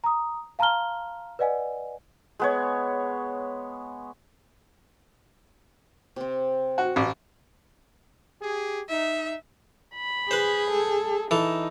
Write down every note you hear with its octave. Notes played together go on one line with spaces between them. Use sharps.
A#5 D#6
F5 A5 A#5 C6 F6 G7
B4 D5 D#5 F#5 G#5
G#3 B3 C#5
C3 C4
F#4
A1
G4 G#4
D#4 E5
B5
G#4 B4 C5
A4
E3 D#4 A4